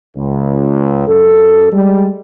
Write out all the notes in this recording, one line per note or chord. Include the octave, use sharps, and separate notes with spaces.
C#2
F#2 A4
G3 G#3